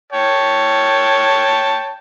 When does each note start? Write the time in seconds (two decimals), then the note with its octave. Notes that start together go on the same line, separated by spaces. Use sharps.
0.13 C#5 G5 A5